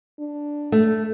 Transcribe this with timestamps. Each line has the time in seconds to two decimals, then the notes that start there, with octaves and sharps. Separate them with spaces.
0.19 D4
0.72 A3